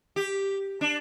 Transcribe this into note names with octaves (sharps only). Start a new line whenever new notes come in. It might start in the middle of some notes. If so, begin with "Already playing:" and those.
G4
D4